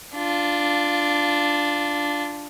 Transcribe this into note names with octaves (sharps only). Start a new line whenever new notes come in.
D4 F4